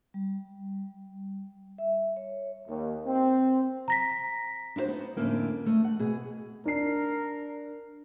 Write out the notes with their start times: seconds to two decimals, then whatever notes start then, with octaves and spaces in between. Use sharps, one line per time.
0.14 G3
1.78 E5
2.17 C#5
2.68 D#2
3.06 C4
3.88 A#5 A#6 B6
4.76 D4 E4 F#4 C5 C#5
4.88 B3 D#4
5.16 F2 A2 D3 A3 A#3 C#4
5.66 E2 A3 D#5
5.84 F#5
5.99 B2 G#4
6.65 D4 A#4 C7